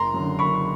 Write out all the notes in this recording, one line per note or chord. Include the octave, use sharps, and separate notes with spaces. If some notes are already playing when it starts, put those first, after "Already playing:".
Already playing: F#1 A#5 C6
F#2
D3
F#1 B5 C#6